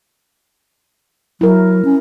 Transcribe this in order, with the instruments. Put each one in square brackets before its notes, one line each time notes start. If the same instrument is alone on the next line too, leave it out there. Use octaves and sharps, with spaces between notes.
[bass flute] F#3 [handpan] E4 A#4
[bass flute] C#4